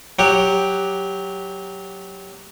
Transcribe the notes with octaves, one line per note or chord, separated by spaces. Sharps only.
F#3 G4